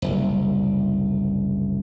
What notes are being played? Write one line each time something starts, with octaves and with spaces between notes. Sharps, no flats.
F#1 C2